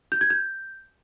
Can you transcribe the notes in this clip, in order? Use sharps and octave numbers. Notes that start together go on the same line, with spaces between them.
G6
G#6
G6